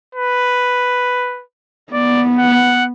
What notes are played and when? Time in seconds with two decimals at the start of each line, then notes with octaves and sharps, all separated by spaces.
0.15 B4
1.93 B3 D5
2.39 F#5